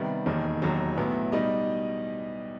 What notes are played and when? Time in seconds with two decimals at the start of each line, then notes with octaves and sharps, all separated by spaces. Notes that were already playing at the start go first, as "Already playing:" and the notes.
Already playing: C3 D#3 G3 B3
0.26 E1 D#2 D#3
0.62 E1 D#2 D#3 F#3
0.97 B1 A2 F#3 B3 E4
1.32 B2 G3 D#4 G4 D#5